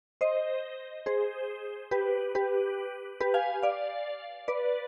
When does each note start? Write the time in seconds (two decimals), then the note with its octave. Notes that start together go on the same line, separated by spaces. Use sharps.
0.21 C5 D#5
1.06 G#4 C5
1.91 G4 B4
2.35 G4 B4
3.21 G4 B4
3.34 F5 G#5
3.63 D5 F5
4.48 B4 D5